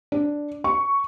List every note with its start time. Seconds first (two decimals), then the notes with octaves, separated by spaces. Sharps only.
0.12 D4
0.64 C#6